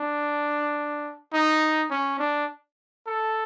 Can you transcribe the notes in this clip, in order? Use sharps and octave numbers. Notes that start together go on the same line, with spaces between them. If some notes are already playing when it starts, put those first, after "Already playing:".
Already playing: D4
D#4
C#4
D4
A4